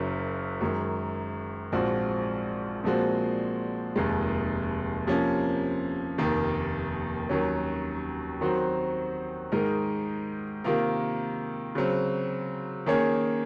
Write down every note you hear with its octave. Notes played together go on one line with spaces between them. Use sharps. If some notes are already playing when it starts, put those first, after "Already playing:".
Already playing: F#1 F#2 C#3 F#3
F#2 D#3 G#3
A#1 G#2 F3 C4 F#4
A#2 F3 G#3 C4 F#4
F1 D#2 D#3 G#3
C3 F3 A#3 C#4
F1 D#2 D#3 A#3
D#2 D#3 F#3 C#4
D#3 F#3 C4 F#4 C5
G#2 D#3 G#3 D#4 A#4
C3 D#3 A#3 F4 A#4
C#3 F#3 C4
D#3 A#3 C#4 G#4 C#5